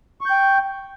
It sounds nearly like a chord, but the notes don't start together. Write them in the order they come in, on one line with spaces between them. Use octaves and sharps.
C#6 G6 G5